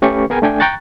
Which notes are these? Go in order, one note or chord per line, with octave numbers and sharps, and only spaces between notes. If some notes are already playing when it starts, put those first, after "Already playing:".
A3 C#4 G4 B4 C#6
B3 G#4 A#4 G5 G#5
A3 D4 G5 G#5
G5 A#5 C#6 F#6 A6